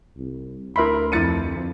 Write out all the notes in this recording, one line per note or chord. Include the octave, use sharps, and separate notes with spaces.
C2
D2 E4 A#4 E5 B5 C6
F2 D4 E4 A6 C#7 D#7